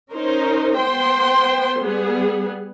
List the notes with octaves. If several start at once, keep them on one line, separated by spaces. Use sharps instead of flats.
C#4 D#4 A#4 C5
B3 C5 G5 C6
G3 B3 G#4